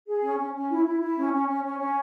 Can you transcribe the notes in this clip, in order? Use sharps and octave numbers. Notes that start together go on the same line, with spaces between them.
G#4
C#4
C#4
C#4
E4
E4
E4
C#4
C#4
C#4
C#4
C#4